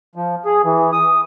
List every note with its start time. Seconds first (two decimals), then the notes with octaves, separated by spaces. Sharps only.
0.16 F3
0.45 G#4
0.64 E3
0.92 D#6